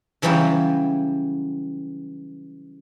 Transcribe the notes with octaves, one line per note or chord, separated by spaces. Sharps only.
C#3 E3 F#3 G3 F4 G4